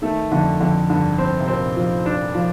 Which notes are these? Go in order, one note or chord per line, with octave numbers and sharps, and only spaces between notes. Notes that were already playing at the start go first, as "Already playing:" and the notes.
D#3 A3
F2 D3
F2 D3
G2 D3
C4
C3
A#2 C4
F3
D4
F3